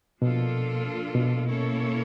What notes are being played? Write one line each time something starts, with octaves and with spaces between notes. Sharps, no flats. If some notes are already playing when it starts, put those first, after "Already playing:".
B2 F3 A#3 D4 F4 A4
B2
A#3 C#4 E4 A4 C#5